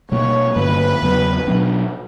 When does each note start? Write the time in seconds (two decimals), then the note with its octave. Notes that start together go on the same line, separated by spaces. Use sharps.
0.12 B2 G3 A#3 C#5
0.56 G2 D3 G3 A#3 B4
1.02 E2 C#3 F#3 B3
1.47 B2 F#3 B3 D4